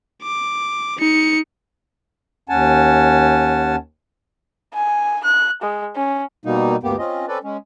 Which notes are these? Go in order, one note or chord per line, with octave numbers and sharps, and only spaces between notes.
D6
D#4 C#7
D#2 C#4 F#5 G#5 A5
G#5
F#6
G#3
C#4
B2 G3 A#3 D#4
D2 G2 A#3 B3 G4
C4 C#4 F4 D#5
C4 C#4 A4 B4 D5
G#3 C#4